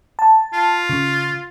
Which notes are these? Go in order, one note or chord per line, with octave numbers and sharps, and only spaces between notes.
A5
F4
C#3